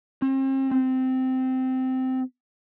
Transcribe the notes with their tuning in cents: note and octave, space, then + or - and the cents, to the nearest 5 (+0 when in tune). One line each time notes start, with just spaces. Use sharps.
C4 +40
C4 -15